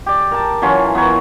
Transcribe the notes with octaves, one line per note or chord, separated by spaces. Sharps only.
G4 D5
A#4 A5
E3 F#3 C#4 F4
B3 A#4 C#5